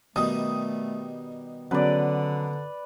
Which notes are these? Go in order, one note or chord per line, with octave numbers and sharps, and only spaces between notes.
B2 D#3 G3 A3 D#6
D3 F#3 B3 C#4 B4 D5